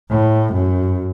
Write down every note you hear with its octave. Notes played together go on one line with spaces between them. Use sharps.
A2
F#2